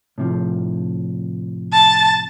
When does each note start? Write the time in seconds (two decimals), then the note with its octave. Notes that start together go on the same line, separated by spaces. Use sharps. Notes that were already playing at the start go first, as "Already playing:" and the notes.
0.18 A2 C3 F3
1.73 A5